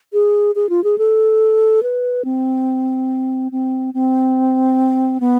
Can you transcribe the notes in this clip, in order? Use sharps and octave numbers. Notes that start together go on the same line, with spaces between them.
G#4
G#4
F4
G#4
A4
B4
C4
C4
C4
B3